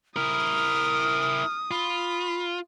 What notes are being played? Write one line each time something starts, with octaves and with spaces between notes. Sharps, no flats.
E4 A#4 D#6 F6
F4 B5